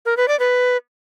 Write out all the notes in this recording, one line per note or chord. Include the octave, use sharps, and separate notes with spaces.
A#4
B4
D5
B4